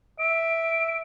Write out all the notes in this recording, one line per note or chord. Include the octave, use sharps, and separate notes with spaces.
E5 D7